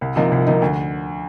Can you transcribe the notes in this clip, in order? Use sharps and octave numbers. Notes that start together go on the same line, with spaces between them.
C2
C3 F3 A#3 D#4
C2
C3 F3 A#3 D#4
D2